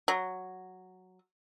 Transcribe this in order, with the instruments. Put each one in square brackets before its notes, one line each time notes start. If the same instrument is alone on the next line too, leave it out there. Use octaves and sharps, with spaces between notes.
[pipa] F#3